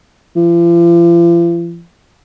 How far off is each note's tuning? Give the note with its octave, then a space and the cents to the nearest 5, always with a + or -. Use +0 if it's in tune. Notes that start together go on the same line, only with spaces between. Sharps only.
F3 -45